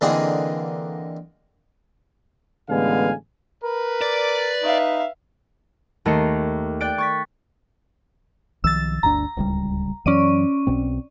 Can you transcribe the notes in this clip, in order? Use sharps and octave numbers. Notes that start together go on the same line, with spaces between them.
D3 E3 A#3 C4 D#4 G#4
A1 D3 G#3 B3 F5 G#5
A#4 B4
D5
D#4 E5 F5
D#2 A3 D#4 A#5 C7 C#7
D5 G5 F#6 A6 D7
C#6 A6 B6
B1 D#3 F3 E6 A6
G1 D2 D4 A#5
D1 C#2 G3
F#2 E3 F#3 C#4 D5 D#7
B1 B2 C4